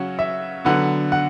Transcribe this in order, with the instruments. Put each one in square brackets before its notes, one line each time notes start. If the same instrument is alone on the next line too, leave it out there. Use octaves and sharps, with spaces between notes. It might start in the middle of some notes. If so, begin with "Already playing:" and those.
Already playing: [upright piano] C#3 F#3 C#4 F#5
E5
D3 F#3 B3 F#5
F#5